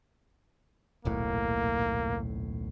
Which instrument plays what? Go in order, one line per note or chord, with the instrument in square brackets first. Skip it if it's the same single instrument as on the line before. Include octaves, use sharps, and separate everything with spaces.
[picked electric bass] D#1 B1 A2 [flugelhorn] A#3